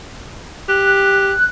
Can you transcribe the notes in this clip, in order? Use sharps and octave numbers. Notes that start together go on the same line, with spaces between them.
G4 F#6